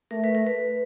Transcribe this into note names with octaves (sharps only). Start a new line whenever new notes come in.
A3 A#4
B4
A#4
B4